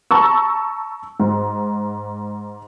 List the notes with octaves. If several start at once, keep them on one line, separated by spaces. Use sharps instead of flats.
A5 A#5 C#6 E6
G#2